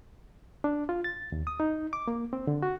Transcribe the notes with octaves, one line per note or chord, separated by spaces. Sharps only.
D4
F4
A6
D#2
D#6
D#4
D6
A#3
C4
D3
F#4